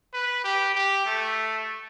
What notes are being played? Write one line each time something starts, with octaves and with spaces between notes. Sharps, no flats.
B4
G4
G4
A3